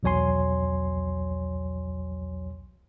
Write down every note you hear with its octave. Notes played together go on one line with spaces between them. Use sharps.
B1 E2 F#3 C#5 G#5 C6